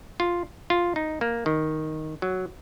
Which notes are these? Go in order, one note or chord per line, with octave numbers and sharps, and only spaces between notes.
F4
F4
D#4
A#3
D#3
F#3